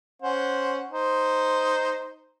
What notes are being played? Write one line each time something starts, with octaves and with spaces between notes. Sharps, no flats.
C#4 C5 F#5
D#4 C5